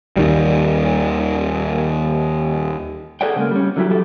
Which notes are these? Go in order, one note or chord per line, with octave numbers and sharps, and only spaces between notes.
D#2 D#3 G3
G#4 A4 C5 D5 F#5 G5
C#3 G#3 A#3
G3 C#4
D3 F#3 E4 G4
F#3 G4 A4